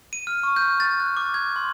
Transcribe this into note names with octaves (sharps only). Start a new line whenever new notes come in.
D#7
F6
C#6
G6
A6
F#6
D6
G#6
C6